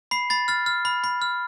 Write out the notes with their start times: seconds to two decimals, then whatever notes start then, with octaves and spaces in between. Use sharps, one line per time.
0.11 B5 C7
0.30 B5 A6
0.48 F6 A6
0.66 F6
0.85 B5
1.04 B5
1.22 F6